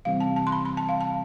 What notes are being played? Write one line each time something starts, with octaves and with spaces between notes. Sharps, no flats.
C3 E3 G3 C4 F5
A5
A5
C6
B5
B5
A5
F5
A5